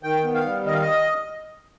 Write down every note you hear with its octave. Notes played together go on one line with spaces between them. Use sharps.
D#3 G5
B3
F5
G3
D#3 D#5
F5
D#5